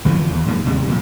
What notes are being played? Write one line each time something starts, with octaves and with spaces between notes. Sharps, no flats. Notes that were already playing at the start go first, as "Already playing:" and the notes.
G1 F2 E3 F3
D#2
F2 G#2 C3 A#3
D#2 C3 G3 G#3
F2 A#2